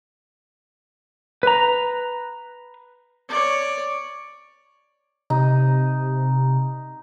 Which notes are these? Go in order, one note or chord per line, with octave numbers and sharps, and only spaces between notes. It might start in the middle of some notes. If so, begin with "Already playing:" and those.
B4 A#5
C#5 D5
C3 D#4